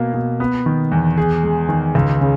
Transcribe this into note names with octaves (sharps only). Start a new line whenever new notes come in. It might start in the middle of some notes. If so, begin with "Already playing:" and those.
Already playing: B2 A#3
B2
B3
D#3
E2
G#4
G#3
D#3
C#2
C#3